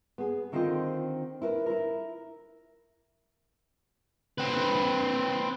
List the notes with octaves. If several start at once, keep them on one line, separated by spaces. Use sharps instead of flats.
B3 G#4
D3 D#3 C4 F4 C5 D#5
E4 A#4 B4
E4 A#4
C4 B4